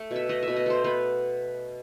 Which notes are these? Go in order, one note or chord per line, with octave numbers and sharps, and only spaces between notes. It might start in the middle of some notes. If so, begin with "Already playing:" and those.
Already playing: A3
B2
E5
A3 D#5
E5
B2
D#5
A3 C5
B3 B4